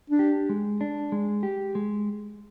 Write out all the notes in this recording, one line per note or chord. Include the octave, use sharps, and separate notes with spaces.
D4
G4
G#3
D4
G#3
G4
G#3